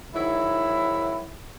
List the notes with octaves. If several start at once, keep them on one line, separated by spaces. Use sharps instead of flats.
G#2 D#3 F#3 E4